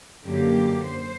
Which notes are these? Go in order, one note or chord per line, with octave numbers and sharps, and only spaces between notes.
F#2 D3 F#3 A#3 G4
C5